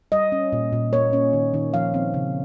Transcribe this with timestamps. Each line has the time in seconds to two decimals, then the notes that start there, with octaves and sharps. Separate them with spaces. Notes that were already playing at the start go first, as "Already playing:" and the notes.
0.12 G3 D#5
0.32 C#4
0.52 A#2
0.73 A#2
0.92 A#3 C#5
1.13 C#4
1.33 D#3
1.54 D#3
1.74 F3 F5
1.94 C4
2.14 C#3